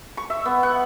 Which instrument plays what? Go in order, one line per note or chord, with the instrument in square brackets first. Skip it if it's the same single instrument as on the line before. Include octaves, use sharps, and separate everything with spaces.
[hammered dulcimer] C#6
E5
B3
F#5